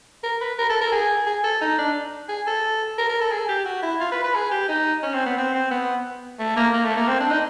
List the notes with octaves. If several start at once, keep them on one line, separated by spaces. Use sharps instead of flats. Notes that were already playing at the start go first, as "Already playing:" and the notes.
A#4
B4
A#4
A4
A#4
G#4
G#4
A4
D#4
D4
G#4
A4
A#4
A#4
A4
G#4
G4
F#4
E4
F4
B4
B4
G#4
G4
D#4
C#4
C4
B3
C4
C4
B3
A3
A#3
A#3
A3
A#3
C4
D4
D#4